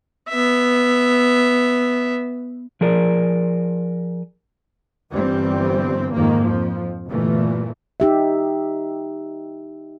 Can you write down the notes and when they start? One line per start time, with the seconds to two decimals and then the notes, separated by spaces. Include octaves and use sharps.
0.29 B3 E5
2.81 F3 G#4 A#4 D5
5.10 G1 G2 E3 G3 C4
6.12 F2 G#2 D#3 A#3
6.45 F2 F3
7.06 G1 A#2 E3 A3
8.00 D#4 G4 E5